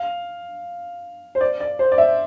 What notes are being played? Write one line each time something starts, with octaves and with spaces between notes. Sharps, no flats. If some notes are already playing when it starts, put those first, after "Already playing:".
Already playing: F5
C5
D5
D5
C5
D5
E5